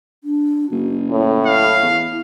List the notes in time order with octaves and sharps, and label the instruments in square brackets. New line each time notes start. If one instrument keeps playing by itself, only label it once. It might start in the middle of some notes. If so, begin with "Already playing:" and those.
[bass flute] D4
[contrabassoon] F#1 [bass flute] F#4
[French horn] A2 [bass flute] C#5
[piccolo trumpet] F5
[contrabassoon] E2 [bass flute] E4